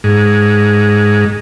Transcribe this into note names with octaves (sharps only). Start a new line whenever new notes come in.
G#2